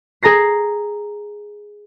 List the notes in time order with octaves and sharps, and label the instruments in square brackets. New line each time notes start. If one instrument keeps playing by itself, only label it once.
[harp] G#4 A#5 A#6 C7